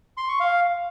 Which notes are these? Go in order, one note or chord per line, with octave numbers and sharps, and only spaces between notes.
C6
C#6
F5